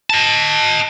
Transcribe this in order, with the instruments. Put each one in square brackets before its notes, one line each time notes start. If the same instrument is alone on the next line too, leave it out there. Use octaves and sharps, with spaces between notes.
[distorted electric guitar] D#5 A5